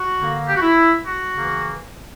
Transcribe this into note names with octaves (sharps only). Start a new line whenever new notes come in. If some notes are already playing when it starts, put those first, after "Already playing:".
Already playing: F#4
D3 A#3
G4
F#4
E4
F#4
C#3 E3 A#3